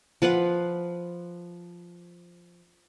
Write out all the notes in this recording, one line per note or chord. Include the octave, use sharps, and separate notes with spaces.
F3 B4 F5 F#5